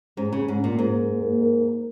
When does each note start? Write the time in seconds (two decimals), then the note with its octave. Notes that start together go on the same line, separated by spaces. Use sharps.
0.17 G#2 C#4
0.33 C#3
0.38 C#4
0.48 G#2
0.59 C#4
0.64 A#2
0.79 G#2 A#3
0.99 A#3
1.20 A#3
1.41 A#4
1.61 A#4